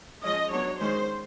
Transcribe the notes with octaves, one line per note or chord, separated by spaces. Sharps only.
F3 G#3 C#4 D#5
F#3 B3 D4 C#5
D#3 G#3 C#4 C5